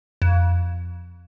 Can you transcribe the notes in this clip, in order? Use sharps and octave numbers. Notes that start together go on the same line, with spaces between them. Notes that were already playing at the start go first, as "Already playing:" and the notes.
F2